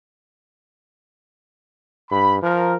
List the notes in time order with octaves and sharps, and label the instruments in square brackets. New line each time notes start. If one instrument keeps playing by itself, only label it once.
[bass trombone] G2 [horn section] B5
[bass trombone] F3 [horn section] A#4